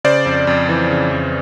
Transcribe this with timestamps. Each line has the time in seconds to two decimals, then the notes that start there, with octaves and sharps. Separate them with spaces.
0.04 C#3 C5 D5
0.26 F2
0.47 F2
0.69 E3
0.91 C#3
1.12 F2